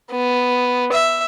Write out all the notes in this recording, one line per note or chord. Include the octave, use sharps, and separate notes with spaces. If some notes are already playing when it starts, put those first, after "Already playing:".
B3
E5